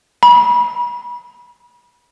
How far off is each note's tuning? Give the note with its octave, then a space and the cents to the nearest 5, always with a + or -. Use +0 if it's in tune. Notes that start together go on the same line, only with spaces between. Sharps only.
B5 -35